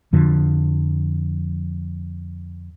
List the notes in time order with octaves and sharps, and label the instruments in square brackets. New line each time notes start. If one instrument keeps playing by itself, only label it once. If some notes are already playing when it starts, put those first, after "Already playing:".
[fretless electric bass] F2 D3 F3